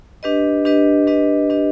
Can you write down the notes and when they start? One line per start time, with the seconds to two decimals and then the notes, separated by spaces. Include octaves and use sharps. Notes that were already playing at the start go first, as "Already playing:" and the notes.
0.23 D4 G4 B4 D#5
0.65 D4 G4 B4 D#5
1.07 D4 G4 B4 D#5
1.50 D4 G4 B4 D#5